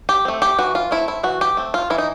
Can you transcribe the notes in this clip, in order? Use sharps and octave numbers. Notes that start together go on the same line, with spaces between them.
G4
A3 C4
G4
E3 F#4
F4
A3 C4 E4
E4
E3 F#4
G4
A3 C4
F4
E3 E4
D#4